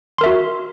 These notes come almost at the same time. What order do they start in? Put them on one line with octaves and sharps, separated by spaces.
C6 A#4 E5 F#4